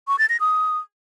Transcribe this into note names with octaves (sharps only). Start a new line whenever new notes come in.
C#6
A6
A#6
D#6